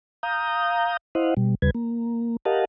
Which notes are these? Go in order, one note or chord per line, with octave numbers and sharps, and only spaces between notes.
F5 A#5 D#6 G6
E4 C5 D#5 F5 F#5
B2 G3
D#2 C#3 G3 B4 G#6
A#3
G4 A#4 D#5 F5 F#5 A5